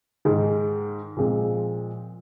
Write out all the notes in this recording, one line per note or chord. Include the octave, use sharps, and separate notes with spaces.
G#2 D#3 G#3
A#2 F3 G#3 C4